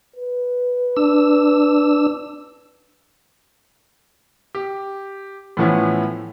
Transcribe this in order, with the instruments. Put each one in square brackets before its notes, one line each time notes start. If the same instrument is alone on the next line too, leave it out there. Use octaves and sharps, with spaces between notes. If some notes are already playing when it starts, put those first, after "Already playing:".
[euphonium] B4
[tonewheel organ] D4 E6
[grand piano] G4
A2 E3 F3 B3 C#4 E4